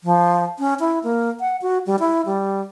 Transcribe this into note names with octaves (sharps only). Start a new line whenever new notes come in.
F3
C#4
E4
A#3
F#5
F#4
G3
E4
G3